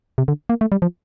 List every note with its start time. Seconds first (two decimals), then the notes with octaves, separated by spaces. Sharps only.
0.18 C3
0.28 D3
0.49 A#3
0.61 A3
0.72 G3
0.82 F3